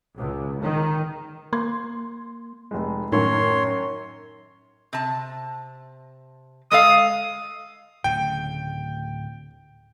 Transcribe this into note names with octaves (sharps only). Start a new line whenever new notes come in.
C#2
D#3
A#3 C6 G#6
F1 G#3
F#2 A2 D#3 C#5 C6
C3 A5
G#3 A4 F5 D#6
D1 A2 C#3 G5